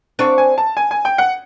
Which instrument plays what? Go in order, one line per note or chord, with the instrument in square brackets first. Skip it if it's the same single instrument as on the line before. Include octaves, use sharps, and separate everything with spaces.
[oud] C4 D4 [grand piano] C#6
[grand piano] G#5
A5
G#5
G#5
G5
F#5